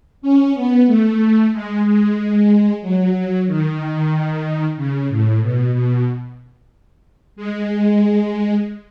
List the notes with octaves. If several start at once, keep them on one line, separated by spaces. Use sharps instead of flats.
C#4
B3
A3
G#3
G#3
F#3
D#3
C#3
A2
B2
B2
G#3